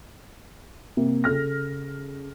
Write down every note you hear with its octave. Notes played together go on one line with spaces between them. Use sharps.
C3 A#3
C#3 A4 F6 A#6